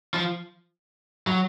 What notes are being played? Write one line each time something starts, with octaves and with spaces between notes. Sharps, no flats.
F3
F#3